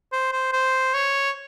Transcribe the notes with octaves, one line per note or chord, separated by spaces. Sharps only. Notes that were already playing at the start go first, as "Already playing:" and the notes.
C5
C5
C5
C#5